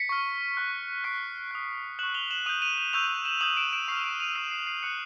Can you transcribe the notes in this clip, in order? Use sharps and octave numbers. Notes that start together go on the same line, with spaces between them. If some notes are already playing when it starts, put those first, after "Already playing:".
Already playing: B6 C#7
C#6 F6
C#6 F#6
C#6 F#6 C7 D7
D#6 F#6
C#6 F#6 E7 F#7
F7 G7
E7 F#7
F#7
D#6 G6 D#7 F7
D#7 F7
D#7 F7
C#6 E6 G6 D#7 F7
E7 F#7
D#6 G6 E7 F#7
D7 E7
D7 E7
C#6 F6 C7
D7 E7
D#7 F7
C#6 E6 G6 C7
C7
C7
D#6 F#6 C#7 D#7